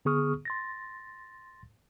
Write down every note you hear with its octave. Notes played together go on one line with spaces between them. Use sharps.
D3 B3 G#4 C#6 D#6 F6
C6 A6 A#6